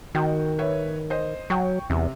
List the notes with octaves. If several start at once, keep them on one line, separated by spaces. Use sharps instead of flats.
D#3 F#4 G5 G6
B4 C#5 E5
C5 D#5
F#3 G5 C#6
E2 C3